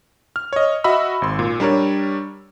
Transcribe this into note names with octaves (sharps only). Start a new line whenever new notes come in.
F6
C#5 D#5
F#4 D#5 E5 B5 E6
G#1 C6
A#2
G3 D4 A#4 C#5